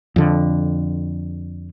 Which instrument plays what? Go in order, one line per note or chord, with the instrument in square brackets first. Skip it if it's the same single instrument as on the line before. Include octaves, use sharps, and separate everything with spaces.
[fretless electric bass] F2 D3